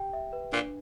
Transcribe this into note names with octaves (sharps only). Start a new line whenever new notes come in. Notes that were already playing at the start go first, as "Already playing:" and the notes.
Already playing: G4 G5
E5
B4
A#2 D4